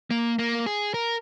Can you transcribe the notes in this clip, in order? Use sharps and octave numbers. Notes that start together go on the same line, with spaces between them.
A#3
A#3
G#4
A#4